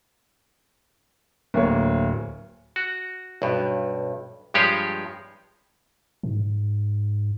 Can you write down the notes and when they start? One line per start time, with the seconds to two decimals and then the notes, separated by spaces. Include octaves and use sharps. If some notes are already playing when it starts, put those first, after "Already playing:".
1.54 D1 A#3 C#5
2.76 F#4
3.42 B1 G2
4.54 G2 F3 G#3 G4 G#4 C#5
6.23 G#2